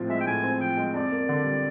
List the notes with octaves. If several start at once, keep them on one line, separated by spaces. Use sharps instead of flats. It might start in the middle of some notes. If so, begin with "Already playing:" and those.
Already playing: A2 F3 C4
G#3 E5
G5
A2 G#5
C4
F3 G5
G#3
F2 D5
A#3
D3
G3